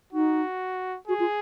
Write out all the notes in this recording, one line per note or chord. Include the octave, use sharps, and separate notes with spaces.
D#4 F#4
F#4 G#4
F4